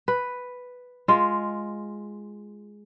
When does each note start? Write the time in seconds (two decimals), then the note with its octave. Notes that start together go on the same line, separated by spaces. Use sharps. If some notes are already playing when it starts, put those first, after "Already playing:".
0.08 B4
1.08 G#3 F4